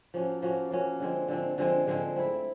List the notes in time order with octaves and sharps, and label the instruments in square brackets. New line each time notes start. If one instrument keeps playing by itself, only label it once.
[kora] F3 A#3 C#4 F#4
F3 A#3 C#4 F#4
F3 A#3 C#4 F#4
D3 F3 G#3 C4
D3 F3 G#3 C4
D3 F3 G#3 C4
D3 F3 G#3 C4
A3 C4 E4